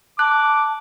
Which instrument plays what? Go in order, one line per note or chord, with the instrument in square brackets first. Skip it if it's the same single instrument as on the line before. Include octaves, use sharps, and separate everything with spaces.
[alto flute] A5 [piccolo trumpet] D6 [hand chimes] F#6